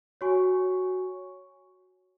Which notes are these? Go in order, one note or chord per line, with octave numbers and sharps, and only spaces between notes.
F#4 C#5 G#5 C#6